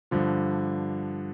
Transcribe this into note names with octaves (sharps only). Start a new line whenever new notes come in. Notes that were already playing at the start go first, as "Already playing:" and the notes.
G2 D3 F3